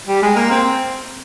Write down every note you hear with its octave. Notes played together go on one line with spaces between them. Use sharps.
G3
G#3
A#3
C4